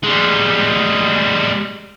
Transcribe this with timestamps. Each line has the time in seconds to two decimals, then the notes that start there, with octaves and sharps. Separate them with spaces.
0.03 G3 G#3